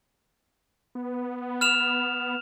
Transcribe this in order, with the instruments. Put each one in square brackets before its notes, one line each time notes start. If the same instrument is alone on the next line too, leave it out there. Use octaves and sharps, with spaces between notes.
[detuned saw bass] B3
[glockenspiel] F6 E7 F7